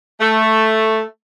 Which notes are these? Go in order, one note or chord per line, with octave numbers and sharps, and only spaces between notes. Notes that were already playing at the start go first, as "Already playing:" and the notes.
A3